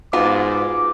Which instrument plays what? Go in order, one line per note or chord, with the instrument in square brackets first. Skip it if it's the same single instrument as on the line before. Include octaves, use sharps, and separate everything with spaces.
[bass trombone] G#2 [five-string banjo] B3 F4 F#4 [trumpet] D6